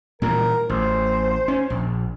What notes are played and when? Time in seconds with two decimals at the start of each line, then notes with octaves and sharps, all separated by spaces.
0.22 A#2 E3 G3 A#4
0.69 A1 C5
1.48 C#4
1.70 A#1